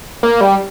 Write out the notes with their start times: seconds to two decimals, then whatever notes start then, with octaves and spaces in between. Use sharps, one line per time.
0.23 A#3
0.41 G3